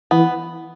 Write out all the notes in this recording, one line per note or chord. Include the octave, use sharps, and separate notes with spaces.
E3 B3